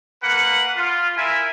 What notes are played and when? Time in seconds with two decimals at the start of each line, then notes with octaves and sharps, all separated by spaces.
0.22 A#3 B4 F#5
0.76 F4
1.17 E4 A#4 E5 G#5